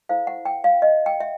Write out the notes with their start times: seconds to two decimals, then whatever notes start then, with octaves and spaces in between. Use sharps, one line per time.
0.09 E4 A4 C5 F5
0.27 F#5
0.45 G5
0.64 F5
0.82 D#5
1.06 G5
1.20 E5